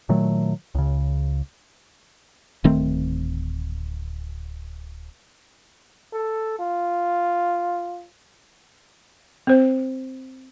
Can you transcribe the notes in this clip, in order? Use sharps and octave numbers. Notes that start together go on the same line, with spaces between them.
A#2 D#3 F#3 A3
C#2 C#3
D1 D#3 A3 C4
A4
F4
C4 C5